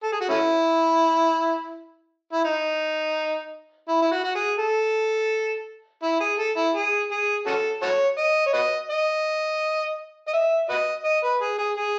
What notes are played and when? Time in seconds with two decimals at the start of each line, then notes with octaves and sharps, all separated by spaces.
0.03 A4
0.12 G#4
0.21 F#4
0.29 A3 C#4 E4
2.33 E4
2.45 D#4
3.89 E4
4.02 E4
4.11 F#4
4.24 F#4
4.35 G#4
4.59 A4
6.03 E4
6.20 G#4
6.39 A4
6.57 E4
6.75 G#4
7.11 G#4
7.46 C#4 F#4 A4
7.82 F#4 A4 C#5
8.18 D#5
8.47 C#5
8.54 F#4 B4 D#5
8.91 D#5
10.28 D#5
10.34 E5
10.69 F#4 B4 D#5
11.05 D#5
11.24 B4
11.41 G#4
11.59 G#4
11.77 G#4